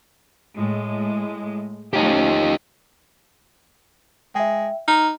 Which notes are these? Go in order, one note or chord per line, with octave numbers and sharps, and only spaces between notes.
A2 G#3
F3 A3 C#4 D#4 G4
G#3 E5 G5
D#4 A#5 F6